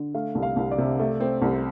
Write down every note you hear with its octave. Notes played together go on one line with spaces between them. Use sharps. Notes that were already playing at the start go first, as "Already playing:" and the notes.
Already playing: D3
A3 F5
C2
F5
C2
D5
C3
A3
C4
C2